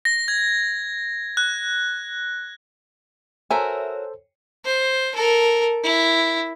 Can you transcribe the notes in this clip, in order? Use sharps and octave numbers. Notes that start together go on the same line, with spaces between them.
A#6
G#6
F#6
F#4 A4 A#4 C5 C#5 E5 G#5
C5
A4 A#4
E4